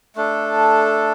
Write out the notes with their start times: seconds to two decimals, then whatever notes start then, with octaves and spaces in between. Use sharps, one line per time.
0.16 A3 D4 A4